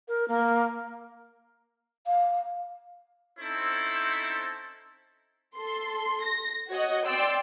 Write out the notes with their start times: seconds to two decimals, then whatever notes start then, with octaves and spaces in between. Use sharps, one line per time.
0.08 A#4
0.28 A#3
2.06 F5
3.39 C4 C#4 D#4 E4 A4 C5
5.57 A4 C6
6.24 A#6
6.70 F#4 C#5 D#5 F#5
7.06 D5 G5 C6 E6